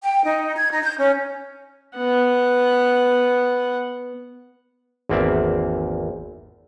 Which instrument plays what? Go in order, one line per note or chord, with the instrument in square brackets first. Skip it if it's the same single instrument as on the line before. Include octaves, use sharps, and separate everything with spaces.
[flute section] G5
D#4
G#6
D#4
G6
C#4
[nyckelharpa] B3 F#5
[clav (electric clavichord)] G#1 E2 A#3 C4 D5 E5